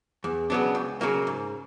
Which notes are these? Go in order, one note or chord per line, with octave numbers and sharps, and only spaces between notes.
E2
C#3 F#3 B3 D4
C#2
C#3 F#3 A#3
G#2